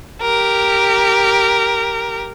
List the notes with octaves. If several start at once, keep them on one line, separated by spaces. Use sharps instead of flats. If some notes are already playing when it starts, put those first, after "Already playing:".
G4 A#4